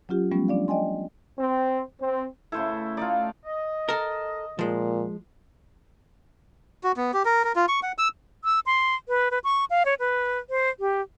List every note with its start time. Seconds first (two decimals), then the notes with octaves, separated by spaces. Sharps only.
0.09 F#3 C#4 F4 G4
0.31 F3 G3 A3 B3 C#4
0.48 D4 D5 F5
0.68 D5 D#5 G5 G#5 C6
1.38 C4
2.01 C4
2.52 C#3 A3 E4 A4 C5
2.97 A3 D#4 F4 D5
3.45 D#5
3.89 A4 A#4
4.59 A#2 F3 G#3
6.84 F#4
6.97 B3
7.13 G4
7.25 A#4
7.44 A#4
7.56 F4
7.68 C#6
7.83 F#5
7.98 E6
8.44 E6
8.66 C6
9.08 B4
9.31 B4
9.44 C#6
9.70 F5
9.85 C#5
10.00 B4
10.50 C5
10.80 G4